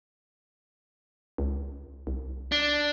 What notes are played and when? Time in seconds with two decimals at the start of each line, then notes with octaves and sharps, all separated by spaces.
1.38 C#2
2.07 C2
2.52 D4